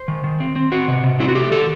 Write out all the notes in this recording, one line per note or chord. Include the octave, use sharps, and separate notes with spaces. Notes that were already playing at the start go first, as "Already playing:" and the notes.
Already playing: C5
D#3
D#3
C4
C4
C4 F#4
C3
C3
C4 E4
F#4
A3 G4
D#3 A4